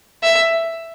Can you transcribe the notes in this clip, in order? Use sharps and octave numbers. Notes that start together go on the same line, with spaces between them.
E5